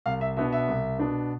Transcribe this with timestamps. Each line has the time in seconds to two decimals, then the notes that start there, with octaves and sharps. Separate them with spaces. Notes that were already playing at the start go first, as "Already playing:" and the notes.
0.06 C2 F5
0.21 E5
0.36 B2 B3 D4 E5
0.52 E5
0.68 C2
0.99 B2 B3 D4